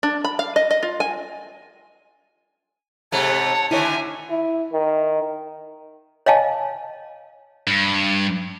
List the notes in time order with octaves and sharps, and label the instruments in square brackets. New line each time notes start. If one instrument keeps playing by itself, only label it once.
[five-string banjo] D4
B5
F5
D#5
D#5
F4
G#5
[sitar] G#2 C3 A3 [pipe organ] C#5 F#5 [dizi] A5
[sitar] D3 D#3 [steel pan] E4 C#5 [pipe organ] E5 G#5
[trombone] E4
D#3
[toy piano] C#5 D#5 F5 G#5 A5
[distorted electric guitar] G2